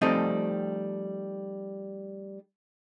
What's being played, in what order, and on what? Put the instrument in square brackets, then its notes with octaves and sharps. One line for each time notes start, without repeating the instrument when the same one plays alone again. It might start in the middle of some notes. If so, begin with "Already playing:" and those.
[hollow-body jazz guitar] F3 G3 A3 C4 D#4 D#5